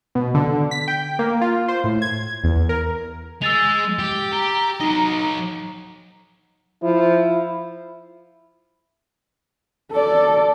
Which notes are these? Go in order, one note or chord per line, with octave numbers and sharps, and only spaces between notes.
B2
D3
B6
G5
A#3
F4
C5
A2
G#6
E2
A#4
G#3 E6 A6 F7
G4
G4 A#5
F#3 D#4 D#5
F3 E4
A4 D5